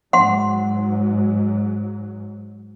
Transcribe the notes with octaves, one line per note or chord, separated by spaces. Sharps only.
G#2 F#3 F#5 C6